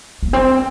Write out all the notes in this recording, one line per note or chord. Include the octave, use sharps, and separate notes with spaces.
A#3
C4